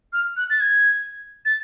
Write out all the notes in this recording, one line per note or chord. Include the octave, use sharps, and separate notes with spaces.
F6
F#6
A6
G#6
A6